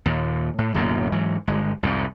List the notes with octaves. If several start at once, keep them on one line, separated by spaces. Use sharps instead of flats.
D#2 A#2
A2
D1 F#2 B2 A#3
G#2 E3 F#3
G1 G#3
C2 F2 G#2